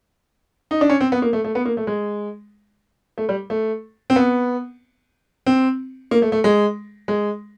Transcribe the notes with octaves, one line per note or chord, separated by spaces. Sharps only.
D#4
D4
C#4
C4
B3
A#3
A3
A3
B3
A#3
A3
G#3
A3
G3
A3
C4
B3
C4
A#3
A3
A3
G#3
G#3